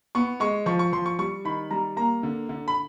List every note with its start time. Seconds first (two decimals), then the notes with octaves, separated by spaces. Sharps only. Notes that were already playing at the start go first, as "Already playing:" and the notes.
0.15 B3 C#6
0.40 G#3 C#6
0.66 F3 C#6
0.79 C#6
0.93 F3 C6
1.06 C#6
1.19 G3 C#6
1.45 D#3 B5
1.71 G3 A#5
1.97 A#3 A#5
2.23 D3
2.49 D3
2.68 B5